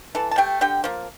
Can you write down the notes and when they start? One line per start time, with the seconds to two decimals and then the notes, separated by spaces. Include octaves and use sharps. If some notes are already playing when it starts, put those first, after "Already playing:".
0.15 E3 A4 A5
0.31 A5
0.38 A3 G4 G5
0.61 D3 G4 G5
0.84 F3 A#3